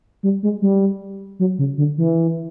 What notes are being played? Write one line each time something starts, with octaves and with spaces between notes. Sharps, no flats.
G3
G#3
G3
F#3
C#3
D3
E3